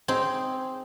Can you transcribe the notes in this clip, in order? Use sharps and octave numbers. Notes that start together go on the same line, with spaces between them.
C4 D#4 G#4